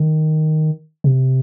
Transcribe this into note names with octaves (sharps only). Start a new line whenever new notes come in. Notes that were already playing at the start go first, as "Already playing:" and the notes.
Already playing: D#3
C3